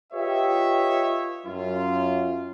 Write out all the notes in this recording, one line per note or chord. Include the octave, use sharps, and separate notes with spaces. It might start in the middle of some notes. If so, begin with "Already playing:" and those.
F4 G4 B4 C#5 D#5 E5
F#2 F4